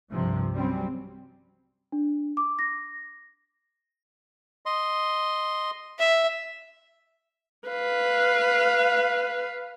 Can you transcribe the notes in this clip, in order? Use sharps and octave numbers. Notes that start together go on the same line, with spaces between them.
C2 G2 C3 F3
F#3 G3 C4 C#4
D4
D6
A#6
D#5 C6
E5
B4 F5